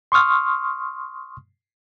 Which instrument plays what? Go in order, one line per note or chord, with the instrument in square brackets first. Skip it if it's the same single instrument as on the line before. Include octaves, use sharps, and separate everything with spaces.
[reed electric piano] C6 C#6 D#6 F6